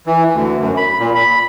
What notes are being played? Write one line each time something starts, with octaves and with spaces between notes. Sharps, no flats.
E3
D2
F#2
B5
A#2
B5